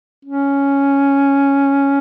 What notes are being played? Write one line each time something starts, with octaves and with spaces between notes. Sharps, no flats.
C#4